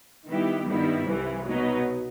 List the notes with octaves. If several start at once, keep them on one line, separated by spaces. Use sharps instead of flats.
D#3 G3 B3 E4 G4
G2 D#3 G3 B3 E4
C2 C3 E3 G3
B2 F#3 B3 D#4